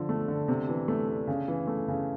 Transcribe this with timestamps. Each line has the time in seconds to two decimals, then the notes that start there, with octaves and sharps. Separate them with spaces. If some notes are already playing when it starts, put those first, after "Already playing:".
Already playing: D3 F3
0.09 A3
0.28 D3
0.48 C3
0.69 E3
0.88 A3
1.09 D4
1.27 C#3
1.48 E3
1.67 A3
1.88 C#3